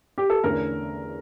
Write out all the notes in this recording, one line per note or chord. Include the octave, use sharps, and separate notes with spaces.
G4
A4
E2 D3 A3 C#4 A#4